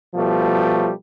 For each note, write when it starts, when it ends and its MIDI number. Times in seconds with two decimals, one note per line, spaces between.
0.15 0.91 47
0.15 0.91 53
0.15 0.91 55
0.15 0.91 57